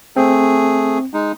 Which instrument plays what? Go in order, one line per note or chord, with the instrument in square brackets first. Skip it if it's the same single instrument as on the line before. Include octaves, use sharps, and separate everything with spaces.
[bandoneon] A3 G#4 [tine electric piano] C4
[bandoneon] G#3 D#4